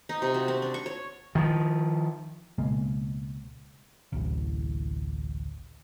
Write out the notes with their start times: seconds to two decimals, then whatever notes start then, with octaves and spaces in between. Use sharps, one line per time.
0.09 D#4
0.22 C3
0.34 F#4
0.48 C4
0.62 D4
0.74 C#6
0.86 C#5
1.35 D#3 F3
2.58 C#2 B2 G#3 A#3
4.12 A1 D2